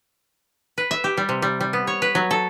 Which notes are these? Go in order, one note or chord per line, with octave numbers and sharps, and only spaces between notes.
B4
E5
G4
G3
C3
G3
G3
B3
C#5
B4
F#3
A4